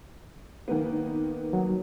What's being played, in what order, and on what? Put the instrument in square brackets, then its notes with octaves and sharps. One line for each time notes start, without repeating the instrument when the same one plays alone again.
[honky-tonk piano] D#3 A#3 B3
[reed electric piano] F#3